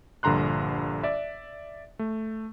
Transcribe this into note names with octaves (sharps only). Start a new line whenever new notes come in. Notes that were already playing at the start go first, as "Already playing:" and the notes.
A#1 G2 D3 A#5 C6 F#6
D5 E5
A3